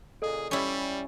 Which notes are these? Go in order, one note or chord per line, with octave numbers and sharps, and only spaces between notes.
A#2 C#3 G#4 A4 D#5 D#6
G3 C#4 E4